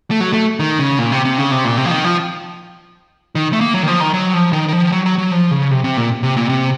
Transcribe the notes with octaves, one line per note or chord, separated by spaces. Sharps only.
A3
F#3
A3
D#3
C#3
A#2
C3
C3
C#3
C3
A#2
C3
F3
D#3
F3
D#3
A3
A#3
F#3
D#3
F3
D#3
F#3
F3
D#3
D#3
F3
F#3
F#3
F#3
F3
C#3
C3
C3
A#2
C3
A#2
C3